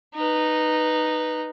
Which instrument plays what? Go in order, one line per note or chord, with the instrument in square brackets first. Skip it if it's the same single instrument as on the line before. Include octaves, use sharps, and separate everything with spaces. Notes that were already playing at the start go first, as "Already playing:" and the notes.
[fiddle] D#4 B4